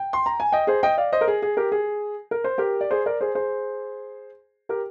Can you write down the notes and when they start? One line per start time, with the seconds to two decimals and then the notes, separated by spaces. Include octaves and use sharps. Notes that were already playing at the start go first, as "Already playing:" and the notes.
Already playing: G5
0.13 C6
0.26 A#5
0.40 G#5
0.52 D#5 G5
0.67 G#4 C5
0.83 D#5 G5
0.98 D5 F5
1.13 C5 D#5
1.21 A#4
1.28 G#4
1.42 G#4
1.57 G4 A#4
1.72 G#4
2.31 A#4
2.44 C5
2.58 G4 A#4
2.81 D5
2.91 G#4 C5
3.06 A#4 D5
3.21 G#4 C5
3.35 G#4 C5
4.69 G4 A#4